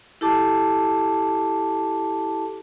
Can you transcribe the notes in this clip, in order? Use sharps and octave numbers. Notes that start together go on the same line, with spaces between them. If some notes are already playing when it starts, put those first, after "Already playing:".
E4 G4 A4 A5 D6